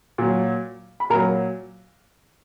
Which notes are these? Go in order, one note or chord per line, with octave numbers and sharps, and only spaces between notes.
A#2 F#3
B5
A#2 F#3 A#4 A#5